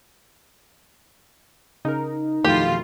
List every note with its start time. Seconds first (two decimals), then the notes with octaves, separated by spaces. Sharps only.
1.85 C#3 D#4 A#4
2.44 F2 B2 D#3 E3 A3 F4 G4